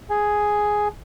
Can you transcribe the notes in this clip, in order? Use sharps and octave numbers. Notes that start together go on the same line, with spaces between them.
G#4 G#5